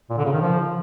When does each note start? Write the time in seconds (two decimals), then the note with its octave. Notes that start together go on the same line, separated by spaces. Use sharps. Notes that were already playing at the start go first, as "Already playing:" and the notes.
0.10 A#2
0.18 D3
0.25 C#3
0.33 D#3
0.41 F3